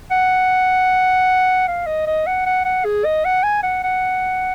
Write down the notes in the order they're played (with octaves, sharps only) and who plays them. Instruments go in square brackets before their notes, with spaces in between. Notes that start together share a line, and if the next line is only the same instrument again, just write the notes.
[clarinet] F#5
F5
D#5
D#5
F#5
F#5
F#5
G#4
D#5
F#5
G#5
F#5
F#5